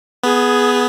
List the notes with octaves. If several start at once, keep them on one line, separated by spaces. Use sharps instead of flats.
B3 G#4